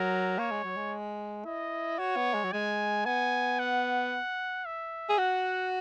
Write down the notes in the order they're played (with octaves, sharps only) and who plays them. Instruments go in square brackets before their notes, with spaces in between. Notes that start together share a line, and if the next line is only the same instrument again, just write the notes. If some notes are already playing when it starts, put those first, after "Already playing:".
Already playing: [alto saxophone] F#3 [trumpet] A#4
[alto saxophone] A#3 [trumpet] C#5
[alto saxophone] G#3
F#3
G#3
[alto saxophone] E4 [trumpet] D#5
[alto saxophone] F#4 [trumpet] C#5
[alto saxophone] B3
G#3
F#3
[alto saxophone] G#3 [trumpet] G#5
[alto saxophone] B3 [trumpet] G#5
[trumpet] F#5
E5
[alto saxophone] G#4
[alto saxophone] F#4 [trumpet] F#5